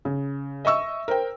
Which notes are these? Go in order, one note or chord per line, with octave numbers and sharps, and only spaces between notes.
C#3
D#5 E5 C#6 E6
A#4 C5 G5